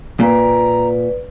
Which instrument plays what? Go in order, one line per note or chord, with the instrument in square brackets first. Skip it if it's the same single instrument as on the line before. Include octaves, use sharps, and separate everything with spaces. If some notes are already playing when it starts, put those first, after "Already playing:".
[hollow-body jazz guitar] A#2 [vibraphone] B4 D5 [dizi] A#5